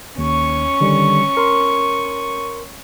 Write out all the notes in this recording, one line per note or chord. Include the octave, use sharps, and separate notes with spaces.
D#2 C#4 C#6
D3 D#3 G3
A#4 C6